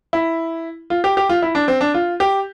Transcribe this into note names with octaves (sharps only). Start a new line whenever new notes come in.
E4
F4
G4
G4
F4
E4
D4
C4
D4
F4
G4